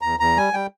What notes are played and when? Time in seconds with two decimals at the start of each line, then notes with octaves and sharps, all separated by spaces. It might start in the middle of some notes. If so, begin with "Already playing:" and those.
0.01 E2 A#5
0.19 E2 A#5
0.37 G3 G#5
0.53 G3 G5